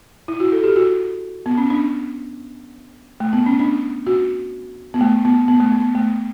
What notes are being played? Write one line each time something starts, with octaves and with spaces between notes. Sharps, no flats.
E4
F#4
A4
G4
F#4
B3
C#4
D4
A3
B3
C#4
D4
F#4
B3
A3
B3
B3
A3
B3
A3